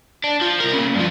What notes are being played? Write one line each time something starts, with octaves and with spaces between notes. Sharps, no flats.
D4
F3
C2 A#4
A#2 C#3
G2 F3